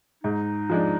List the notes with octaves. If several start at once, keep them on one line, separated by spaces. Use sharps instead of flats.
G#2 D#4
F3 G#3 D4